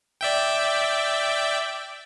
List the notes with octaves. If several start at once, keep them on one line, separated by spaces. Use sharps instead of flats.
D5 E5 G5